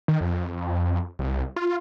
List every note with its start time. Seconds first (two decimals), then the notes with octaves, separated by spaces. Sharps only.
0.08 D#3
0.21 F2
1.19 C2
1.56 F4